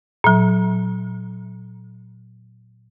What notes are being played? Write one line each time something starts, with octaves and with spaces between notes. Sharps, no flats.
A#2 F#3